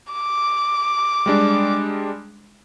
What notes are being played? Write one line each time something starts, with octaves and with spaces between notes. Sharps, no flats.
D6
G3 G#3 D4